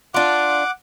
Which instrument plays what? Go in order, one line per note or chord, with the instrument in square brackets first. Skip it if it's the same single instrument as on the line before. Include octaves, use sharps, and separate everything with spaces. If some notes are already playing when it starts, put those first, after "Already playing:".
[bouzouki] D4 F4 [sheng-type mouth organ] F#5 D6